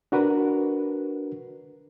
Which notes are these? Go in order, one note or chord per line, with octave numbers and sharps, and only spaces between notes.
D4 F#4 A#4 B4